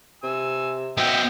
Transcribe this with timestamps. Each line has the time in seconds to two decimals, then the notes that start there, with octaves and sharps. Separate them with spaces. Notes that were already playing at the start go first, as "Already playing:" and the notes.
0.23 C3 G#5 E6
0.98 B3 F#4 C5 D#5 E5 G5